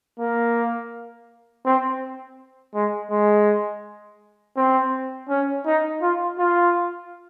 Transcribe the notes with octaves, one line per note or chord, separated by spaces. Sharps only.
A#3
C4
G#3
G#3
C4
C#4
D#4
F4
F4